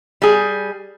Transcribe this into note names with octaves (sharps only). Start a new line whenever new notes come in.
G3 G#4